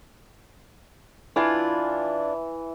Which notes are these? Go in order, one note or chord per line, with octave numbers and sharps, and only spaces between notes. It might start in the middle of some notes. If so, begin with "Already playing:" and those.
E3 D4 E4 F4